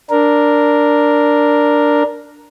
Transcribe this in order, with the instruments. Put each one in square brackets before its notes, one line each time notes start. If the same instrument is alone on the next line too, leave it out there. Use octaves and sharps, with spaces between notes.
[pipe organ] D4 A#4